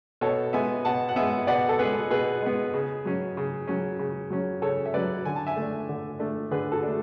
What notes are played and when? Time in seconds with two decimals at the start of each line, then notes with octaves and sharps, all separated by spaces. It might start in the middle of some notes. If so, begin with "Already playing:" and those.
0.21 B2 A4 C#5
0.53 G#3 B3 E5 G#5
0.85 B2 F#5 A5
1.09 F#5
1.16 G#3 B3 E5 G#5
1.47 B2 D5 F#5
1.69 A4
1.79 G#3 B3 G#4 B4
2.10 B2 G#4 B4
2.42 G#3 B3
2.74 C#3
3.05 F#3 C#4
3.37 C#3
3.67 F#3 C#4
3.99 C#3
4.30 F#3 C#4
4.62 C#3 A4 C#5
4.86 E5
4.94 F#3 C#4 B4 D5
5.25 D3 G#5
5.36 A5
5.47 E5 G#5
5.56 A3
5.62 D4
5.89 D3
6.19 A3 D4
6.51 D3 G#4 B4
6.72 F#4 A4
6.83 A3 D4